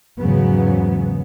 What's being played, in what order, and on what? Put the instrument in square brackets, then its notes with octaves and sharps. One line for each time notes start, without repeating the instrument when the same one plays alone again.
[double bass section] E2 G#2 C#3 F#3 B3